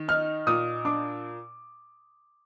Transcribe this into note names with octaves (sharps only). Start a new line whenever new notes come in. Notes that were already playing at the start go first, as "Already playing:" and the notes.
Already playing: D#3
D#4 F6
A#2 D#6
D4 D6